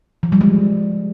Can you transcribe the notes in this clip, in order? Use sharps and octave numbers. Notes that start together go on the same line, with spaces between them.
F3
G3
G#3